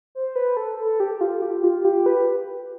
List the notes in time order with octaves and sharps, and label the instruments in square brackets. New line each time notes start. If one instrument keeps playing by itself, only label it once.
[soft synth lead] C5
B4
A4
A4
G4
F4
G4
F4
G4
B4